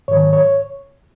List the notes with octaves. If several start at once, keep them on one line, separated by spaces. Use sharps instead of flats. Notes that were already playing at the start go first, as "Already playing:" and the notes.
G#2 D#3 F#3 C#5
C#5